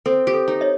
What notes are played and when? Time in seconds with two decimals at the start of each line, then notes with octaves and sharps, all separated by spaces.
0.06 C4 A4
0.27 G4
0.34 A4
0.48 D#4
0.61 C#5 D#5